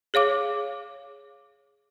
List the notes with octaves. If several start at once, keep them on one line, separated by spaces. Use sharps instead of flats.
G#4 C#5 F5 D6